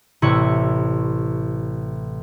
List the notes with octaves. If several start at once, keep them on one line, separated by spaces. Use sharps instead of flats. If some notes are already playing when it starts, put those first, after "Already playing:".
A1 C3 E4 C#5 C#6 C#7